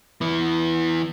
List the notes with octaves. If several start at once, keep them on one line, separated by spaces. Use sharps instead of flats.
E3 B3